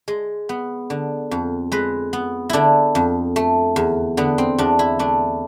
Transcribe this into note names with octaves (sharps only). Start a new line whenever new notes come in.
G#3
B3
D3
F2
G#3 B4
B3
D3 D4 E4
F2
A3
E2
D3 B3
C4
E2 D4
E4
A3 D4